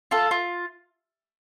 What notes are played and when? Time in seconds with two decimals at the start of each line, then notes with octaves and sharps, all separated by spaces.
0.11 F4 A4
0.31 F4